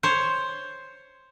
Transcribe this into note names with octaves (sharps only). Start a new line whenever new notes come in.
C5 C#5